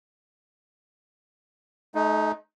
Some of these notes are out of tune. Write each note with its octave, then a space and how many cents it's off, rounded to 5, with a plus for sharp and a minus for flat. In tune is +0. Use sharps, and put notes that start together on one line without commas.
A3 -40 D#4 +0